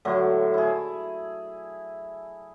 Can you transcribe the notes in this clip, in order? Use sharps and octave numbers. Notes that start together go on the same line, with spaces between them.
A2 D3 F#3
E4 G#4